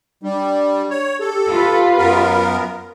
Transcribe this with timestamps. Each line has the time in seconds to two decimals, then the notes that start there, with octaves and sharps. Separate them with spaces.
0.23 G3 D4
0.90 C#5
1.21 G4 A4
1.51 F4 B4
1.98 F#2 B3 A#4